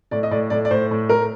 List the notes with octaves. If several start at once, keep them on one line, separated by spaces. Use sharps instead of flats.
A2 D5
D#5
A2 D5
A2 D5
D5
A2 C5
A2
A2 A#4